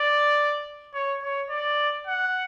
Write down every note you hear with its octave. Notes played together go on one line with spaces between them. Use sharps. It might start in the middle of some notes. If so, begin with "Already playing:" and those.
Already playing: D5
C#5
C#5
D5
F#5